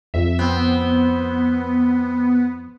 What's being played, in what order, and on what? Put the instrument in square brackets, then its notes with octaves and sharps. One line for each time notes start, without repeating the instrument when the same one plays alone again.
[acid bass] F2 [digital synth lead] E5
[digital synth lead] B3 [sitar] C4